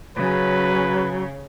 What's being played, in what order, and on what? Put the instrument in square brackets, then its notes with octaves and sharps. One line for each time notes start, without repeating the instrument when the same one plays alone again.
[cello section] C#3 [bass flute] F#3 [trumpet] B4